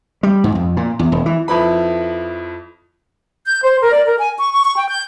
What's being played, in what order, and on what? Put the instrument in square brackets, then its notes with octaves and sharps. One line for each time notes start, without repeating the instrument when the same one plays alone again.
[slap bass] G3
G#2
F2
A#2
E2
E1
E3
[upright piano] F2 F3 E4 B4 B5
[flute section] G6
C5
A#4
D5
A#4
G#5
C#6
C#6
C#6
G5
G6